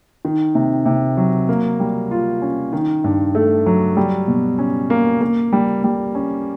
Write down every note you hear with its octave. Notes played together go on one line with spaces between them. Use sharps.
D#3
C3
C3
F#3
A#3
G3
F4
C#4
D#3
G2
A3
F#3
G3
B2
C#4
A#3
A#3
G3
G3
C#4